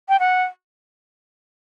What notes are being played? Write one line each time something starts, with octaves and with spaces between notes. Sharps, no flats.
G5
F#5